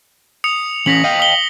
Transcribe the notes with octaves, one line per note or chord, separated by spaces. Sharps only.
D#6 C#7 F7
E3 C#4 A#6 B6 F#7
D#5 F5 G5
D#6 G7